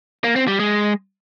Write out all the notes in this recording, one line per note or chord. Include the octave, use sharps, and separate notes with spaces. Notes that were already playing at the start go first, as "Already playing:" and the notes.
A#3
C4
G3
G#3